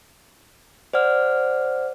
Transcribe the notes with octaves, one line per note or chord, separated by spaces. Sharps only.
C5 D5 F#5 F6